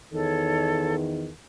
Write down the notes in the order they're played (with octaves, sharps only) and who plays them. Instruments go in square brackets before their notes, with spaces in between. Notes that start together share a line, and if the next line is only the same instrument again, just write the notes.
[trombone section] E2 D#3 [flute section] A4 C#5